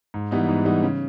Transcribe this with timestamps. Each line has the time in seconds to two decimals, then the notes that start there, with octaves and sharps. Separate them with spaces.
0.14 G#2
0.31 E3 G3 B3 D#4
0.48 G#2
0.65 E3 G3 B3 D#4
0.83 C#3